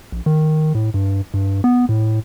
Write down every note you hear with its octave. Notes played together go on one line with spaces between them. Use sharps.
A#1
D#3
A2
G2
G2
B3
A2